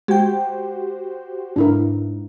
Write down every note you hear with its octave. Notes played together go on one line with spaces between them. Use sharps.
G#3 F#4 G4 C5 G5
G#2 D4 E4 A#4